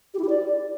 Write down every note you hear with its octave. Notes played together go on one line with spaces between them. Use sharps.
G4
E4
G4
D5